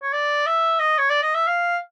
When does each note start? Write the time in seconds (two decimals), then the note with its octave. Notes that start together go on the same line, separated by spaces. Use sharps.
0.03 C#5
0.13 D5
0.46 E5
0.79 D#5
0.98 C#5
1.10 D5
1.23 D#5
1.34 E5
1.47 F5